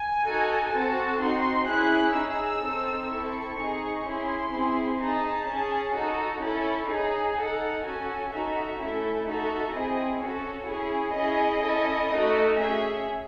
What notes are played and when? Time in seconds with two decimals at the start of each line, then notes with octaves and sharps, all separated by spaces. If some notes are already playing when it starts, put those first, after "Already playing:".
Already playing: G#5
0.24 D#4 F#4 A4
0.71 C4 F#4 A4 A5
1.18 C4 D#4 F#4 C6
1.66 C#4 E4 G#4 F#6
2.14 D#4 G#4 E6
2.62 C4 D#4 A4
3.09 C4 E4 A4 C#6
3.57 D#4 G#4
4.03 C#4 E4 G#4 C6
4.52 C4 E4 G#4
4.99 D#4 G#4 A5
5.46 C#4 G#4
5.95 D#4 F#4 A4
6.42 C#4 E4 A4
6.88 D#4 G#4
7.36 D#4 A4 F#5
7.84 C#4 F#4 A4 G#5
8.31 D#4 F#4 A4 E5
8.79 A3 C#4 E4 A4
9.26 D#4 F#4 A4 E5
9.74 C4 E4 G#4 D#5
10.22 C#4 F#4 A4 C#5
10.69 C#4 E4 G#4
11.16 C#4 E4 G#4 D#5
11.64 C#4 E4 A4
12.12 A3 D#4 F#4 A4
12.60 C#4 G#4 E5